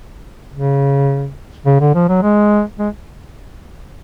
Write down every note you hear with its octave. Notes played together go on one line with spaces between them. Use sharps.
C#3
C#3
D3
F3
F#3
G#3
G#3